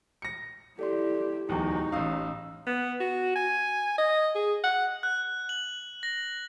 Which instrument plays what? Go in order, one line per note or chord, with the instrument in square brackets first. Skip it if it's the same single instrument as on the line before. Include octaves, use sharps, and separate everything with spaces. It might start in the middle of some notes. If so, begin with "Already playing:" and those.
[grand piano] A#6 C#7
[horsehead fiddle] E4 G4 [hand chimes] A4 D5 C6
[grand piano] D1 E2 [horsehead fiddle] D#4 [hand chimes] G4 G5 C#6
[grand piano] A1 F5 [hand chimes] C#4 D#6 E6
[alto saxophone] B3
F#4
G#5
D#5
G#4
F#5
[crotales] F#6
F#7
A#6